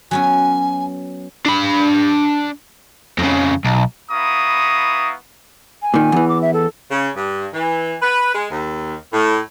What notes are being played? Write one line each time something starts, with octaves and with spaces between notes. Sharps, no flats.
F#3 B3 C#4 G#5
D4 B5
F2 C#3
B1
B3 E4 F5 A#5 C#6 D#6
G#5
A#2 D#3
E2 E3
D6
E5
A4
C#3
G2
E3
B4
G#3
D#2
A2